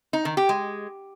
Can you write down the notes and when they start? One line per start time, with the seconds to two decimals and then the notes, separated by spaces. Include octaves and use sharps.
0.13 D#4
0.25 D#3
0.37 G4
0.49 G#3